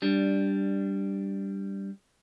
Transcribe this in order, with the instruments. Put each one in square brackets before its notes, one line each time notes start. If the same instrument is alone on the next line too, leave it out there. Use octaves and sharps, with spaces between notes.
[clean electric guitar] G3 D4